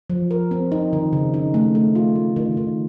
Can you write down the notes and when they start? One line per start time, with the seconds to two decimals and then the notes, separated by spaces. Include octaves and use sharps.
0.10 F3
0.31 A#4
0.51 C4
0.72 D#4
0.93 D#3
1.13 C#3
1.34 D#4
1.54 A3
1.75 A3
1.95 F4
2.16 A3
2.36 D#3
2.57 D#3